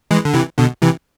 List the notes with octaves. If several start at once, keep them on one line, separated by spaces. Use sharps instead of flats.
E3 G#3
D3
C3 E3
B2 D3
C3 E3